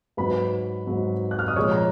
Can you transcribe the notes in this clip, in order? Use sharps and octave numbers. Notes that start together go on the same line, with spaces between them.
G#2 F#3 B4 B5
G#2 F#3
F#6
F6
D#6
A#2 F3 G#3 C#5 C#6
A#5